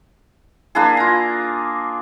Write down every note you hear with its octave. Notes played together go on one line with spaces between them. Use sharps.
A#3 D4 E4 G#4
F4 A#5